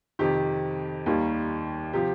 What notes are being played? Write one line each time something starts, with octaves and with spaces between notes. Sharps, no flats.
F2 C3 D#3 G4
D#2 D#3 G3 A#3
C3 F3 G4